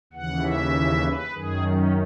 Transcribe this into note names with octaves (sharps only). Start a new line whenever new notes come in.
D#2 C#3 E3 F#5
E5
B4
F#2 D#3 G#4
C#4